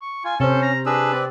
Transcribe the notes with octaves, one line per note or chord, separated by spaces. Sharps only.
C#6
F4 G#5
C3 C#4 A4 C5
A#5
D4 G#4 B4 E6
C4 D5